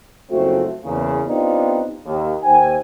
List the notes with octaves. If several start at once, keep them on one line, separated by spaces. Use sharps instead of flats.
F#1 F3 A3 C4 F#4
E2 C#3 A#3
B3 C4 D4 D#4 F4 G4
D#2
D#2 C5 G5 G#5